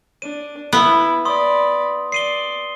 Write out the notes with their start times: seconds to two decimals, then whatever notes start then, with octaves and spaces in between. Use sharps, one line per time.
0.22 D4 D#7
0.73 B3 E4
1.25 D5 B5 C6 D#6
2.12 D5 C7 D#7 G7